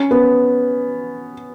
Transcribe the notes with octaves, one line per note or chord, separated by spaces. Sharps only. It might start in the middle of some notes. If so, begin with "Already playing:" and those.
Already playing: C#4
B3